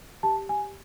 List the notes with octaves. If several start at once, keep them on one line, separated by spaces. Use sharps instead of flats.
G4 A5
G4 G#5